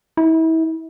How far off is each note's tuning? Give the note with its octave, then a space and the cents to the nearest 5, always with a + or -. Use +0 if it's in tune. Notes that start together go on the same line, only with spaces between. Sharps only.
E4 -35